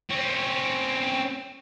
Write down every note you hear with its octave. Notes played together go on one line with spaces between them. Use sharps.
C4 C#4